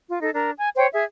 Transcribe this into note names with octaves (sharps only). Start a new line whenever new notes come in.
F4
D#4 A4
D4 A#4
G#5
C5 C#5 G5
G#4 E5